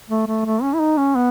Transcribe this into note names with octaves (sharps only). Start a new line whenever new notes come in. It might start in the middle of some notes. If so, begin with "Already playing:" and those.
A3
A3
A3
C#4
E4
D#4
C#4
B3